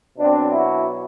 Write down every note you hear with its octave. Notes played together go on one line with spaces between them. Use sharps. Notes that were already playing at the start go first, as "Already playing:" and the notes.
B2 F#3 C4 D4
E4 F#4